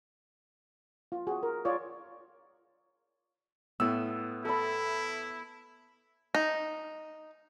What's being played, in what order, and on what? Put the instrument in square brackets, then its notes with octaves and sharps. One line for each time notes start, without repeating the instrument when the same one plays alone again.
[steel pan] F4
F#4 G#4
A#4
F4 C#5 D5
[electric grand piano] A2 E6 [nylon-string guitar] B3
[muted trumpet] E4 [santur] A4 B5
[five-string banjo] D#4